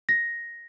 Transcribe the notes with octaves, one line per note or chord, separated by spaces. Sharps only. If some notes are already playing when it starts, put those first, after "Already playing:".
A#6